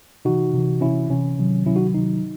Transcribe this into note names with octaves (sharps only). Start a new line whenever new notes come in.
C3 E3 D#4 F#4
C3 E3
C3 E3 C#4 E4
C3 E3 C#4
C3 D#3 F#3
C3 D#3 F#3 C#4 E4
D#4 F#4
C3 D#3 F#3 D#4